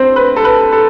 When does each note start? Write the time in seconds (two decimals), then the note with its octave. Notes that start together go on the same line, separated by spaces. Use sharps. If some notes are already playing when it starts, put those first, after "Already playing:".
Already playing: G2 C4 C5
0.16 B4
0.36 A4
0.44 B4
0.72 A4